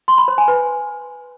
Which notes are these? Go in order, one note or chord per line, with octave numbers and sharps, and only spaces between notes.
C6
B5
C5
G#5
B4